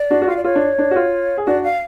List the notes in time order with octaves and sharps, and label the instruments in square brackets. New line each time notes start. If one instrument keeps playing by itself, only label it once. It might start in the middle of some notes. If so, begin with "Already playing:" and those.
Already playing: [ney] D5
[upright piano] D4 F#4
F#4
[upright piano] F4 [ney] F5
[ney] D5
[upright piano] F4 [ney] C#5
[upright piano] D4
D4
F#4
F4
G#4
[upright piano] D4 F#4 [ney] D5
[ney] F5